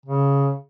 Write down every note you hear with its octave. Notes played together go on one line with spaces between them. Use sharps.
C#3